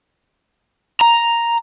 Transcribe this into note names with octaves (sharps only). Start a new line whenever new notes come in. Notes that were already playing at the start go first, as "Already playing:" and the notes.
A#5